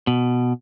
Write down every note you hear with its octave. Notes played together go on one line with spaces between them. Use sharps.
B2